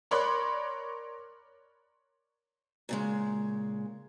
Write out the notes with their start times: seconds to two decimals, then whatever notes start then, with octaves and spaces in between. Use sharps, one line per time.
0.11 A#4 C#5 D5 B5 C6 F#6
2.89 A#2 C#3 G#3